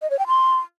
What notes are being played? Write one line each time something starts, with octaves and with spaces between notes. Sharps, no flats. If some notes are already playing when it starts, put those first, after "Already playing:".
D#5
C#5
G5
C6